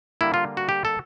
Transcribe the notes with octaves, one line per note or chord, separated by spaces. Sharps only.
D3 G3 A#3 E4
F4
F#4
G4
A4